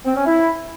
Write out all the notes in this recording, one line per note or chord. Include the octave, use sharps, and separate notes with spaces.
C4
C#4
E4